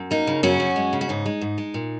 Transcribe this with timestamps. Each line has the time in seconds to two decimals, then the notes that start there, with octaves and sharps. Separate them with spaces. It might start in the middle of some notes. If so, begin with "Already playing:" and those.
Already playing: F#2
0.11 A#3 D#4
0.27 C#3
0.43 F#2 C#4 F#4
0.60 F#2
0.76 G#3
0.93 C#3
1.01 F#4
1.09 G#2 D#4
1.26 G#3
1.41 G#2
1.58 G#3
1.74 A#2